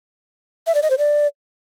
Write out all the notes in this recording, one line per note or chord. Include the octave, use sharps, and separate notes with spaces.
E5
D5
D#5
C5
D5